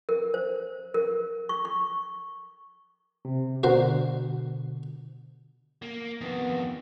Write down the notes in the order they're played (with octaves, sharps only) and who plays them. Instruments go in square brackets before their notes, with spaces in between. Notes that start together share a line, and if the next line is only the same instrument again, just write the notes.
[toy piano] A#4
C5
A#4
C#6
C#6
[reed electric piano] C3
[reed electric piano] B2 D3 [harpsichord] F#4 A#4 C5
[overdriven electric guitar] A#3
[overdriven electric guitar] F2 D#3 [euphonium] B3